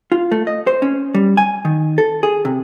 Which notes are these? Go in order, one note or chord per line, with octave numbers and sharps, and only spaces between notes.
F4
A3
D#5
C5
C#4
G3
G#5
D#3
A4
G#4
C3